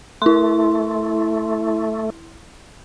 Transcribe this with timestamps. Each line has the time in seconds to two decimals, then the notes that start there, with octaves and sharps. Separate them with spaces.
0.22 A3 E4 C6